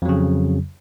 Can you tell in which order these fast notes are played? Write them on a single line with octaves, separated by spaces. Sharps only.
F2 F#3 C#3